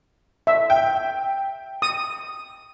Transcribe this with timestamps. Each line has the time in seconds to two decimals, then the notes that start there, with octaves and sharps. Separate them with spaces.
0.47 E5
0.70 G5
1.82 D#6